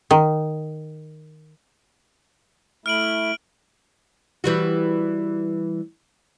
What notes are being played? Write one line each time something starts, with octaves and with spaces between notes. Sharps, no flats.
D#3
A3 E4 F6 D7 F#7
E3 G3 F#4